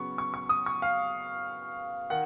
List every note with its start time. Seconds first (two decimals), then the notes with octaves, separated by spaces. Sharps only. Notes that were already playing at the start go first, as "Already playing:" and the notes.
Already playing: C#3 F#3 B3 C#6
0.18 C#6
0.34 C#6
0.49 D#6
0.66 C#6
0.82 F5
2.10 D#3 F#5